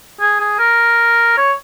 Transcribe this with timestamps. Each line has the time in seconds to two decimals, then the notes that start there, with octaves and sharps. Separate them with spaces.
0.21 G#4
0.40 G#4
0.59 A#4
1.37 C#5